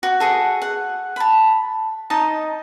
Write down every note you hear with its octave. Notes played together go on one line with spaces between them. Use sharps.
F#4
F#4 G#4 A4
F#5
A5 B5
D#4 D#5 A5